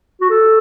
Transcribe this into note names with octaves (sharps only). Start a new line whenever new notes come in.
F#4
A4